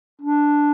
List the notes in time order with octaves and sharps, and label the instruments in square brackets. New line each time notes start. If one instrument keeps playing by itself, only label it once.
[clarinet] D4